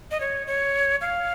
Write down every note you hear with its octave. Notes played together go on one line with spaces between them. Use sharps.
D#5
C#5
C#5
F5